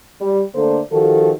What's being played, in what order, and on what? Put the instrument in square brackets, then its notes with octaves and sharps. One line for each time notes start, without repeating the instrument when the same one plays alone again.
[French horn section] G3
D3 A3 A#3 D4 A4 C5
D#3 F3 F#4 G4 A4